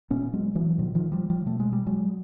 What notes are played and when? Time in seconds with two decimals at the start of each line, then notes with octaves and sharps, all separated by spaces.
0.10 A#2 B3 C#4
0.33 F#3 G#3
0.55 E3 F#3
0.78 A#2 D#3 F3
0.95 D#3 F3
1.12 F3 G3
1.30 F3 G3
1.46 B2 A3
1.60 G#3
1.73 G3
1.86 F#3 G#3